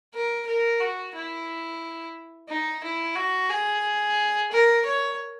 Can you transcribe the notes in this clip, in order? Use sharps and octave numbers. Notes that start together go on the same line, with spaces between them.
A#4
A#4
F#4
E4
D#4
E4
F#4
G#4
A#4
C#5